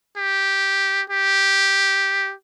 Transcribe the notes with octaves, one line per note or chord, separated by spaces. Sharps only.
G4
G4